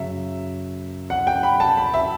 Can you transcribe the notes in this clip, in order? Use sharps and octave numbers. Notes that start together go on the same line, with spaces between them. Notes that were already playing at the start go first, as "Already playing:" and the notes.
Already playing: F#2 C#3 F#3 E5
F#5
G5
B5
A5
B5
E5